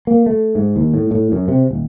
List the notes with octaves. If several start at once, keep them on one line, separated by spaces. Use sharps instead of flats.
A#3
A3
G#2
D#2
A2
A2
F#2
C3
D#1